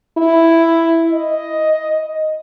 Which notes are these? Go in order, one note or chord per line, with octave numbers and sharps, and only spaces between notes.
E4
D#5